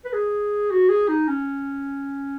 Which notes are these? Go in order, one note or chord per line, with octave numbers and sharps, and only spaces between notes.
B4
G#4
F#4
G#4
D#4
C#4